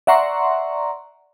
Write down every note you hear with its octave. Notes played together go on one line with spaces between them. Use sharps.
D5 E5 F#5 A#5 C6 C#6